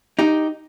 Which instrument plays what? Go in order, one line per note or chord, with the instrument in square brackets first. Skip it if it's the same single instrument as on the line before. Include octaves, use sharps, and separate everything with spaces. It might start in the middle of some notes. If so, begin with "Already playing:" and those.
[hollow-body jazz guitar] D#4 G4